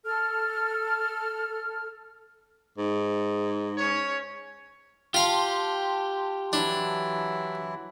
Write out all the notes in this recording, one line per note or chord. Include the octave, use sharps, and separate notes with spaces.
A4 F6
G#2
C#4 C#5
F4 G4 F5 A5 C6
E3 F#3 D4 E4